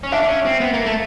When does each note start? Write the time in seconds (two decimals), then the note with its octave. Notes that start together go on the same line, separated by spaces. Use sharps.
0.04 C#4
0.12 D4 E5
0.23 D4
0.28 C#4
0.45 C4
0.61 B3
0.73 A#3
0.86 A3